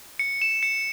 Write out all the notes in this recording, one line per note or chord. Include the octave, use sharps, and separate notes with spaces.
C#7
E7
C#7